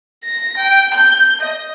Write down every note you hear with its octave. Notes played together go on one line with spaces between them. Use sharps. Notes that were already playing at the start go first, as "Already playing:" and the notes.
A#6
G5
G6
D#5